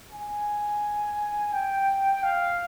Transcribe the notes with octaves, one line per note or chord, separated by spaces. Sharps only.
G#5
G5
F5